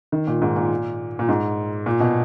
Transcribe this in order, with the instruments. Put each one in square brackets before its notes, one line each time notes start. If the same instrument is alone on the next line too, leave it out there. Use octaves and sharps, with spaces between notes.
[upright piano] D#3
A#2
G#2
A#2
A#2
G#2
A#2
B2